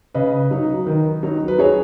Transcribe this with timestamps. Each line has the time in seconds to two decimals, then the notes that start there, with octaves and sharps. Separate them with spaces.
0.14 C#3 B4 D#5
0.51 F#3 D#4
0.87 D#3
1.23 F#3 D#4
1.48 B4
1.59 F#3 G#4 C#5